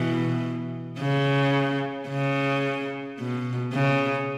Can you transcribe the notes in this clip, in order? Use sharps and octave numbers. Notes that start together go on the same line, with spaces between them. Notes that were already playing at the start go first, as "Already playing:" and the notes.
Already playing: B2 E3
C#3
C#3
B2
C#3